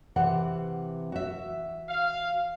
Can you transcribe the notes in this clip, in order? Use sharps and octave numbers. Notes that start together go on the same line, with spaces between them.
C3 E3 F#5
F#4 E5
F5